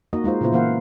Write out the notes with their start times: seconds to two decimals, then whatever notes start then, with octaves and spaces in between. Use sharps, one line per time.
0.13 A#3 D#4 F#4 D#5
0.24 G#3 D#4 F4 C5
0.41 A#2 C#3 B3 E4 F4 C5
0.52 E3 A#3 C5 F5 F#5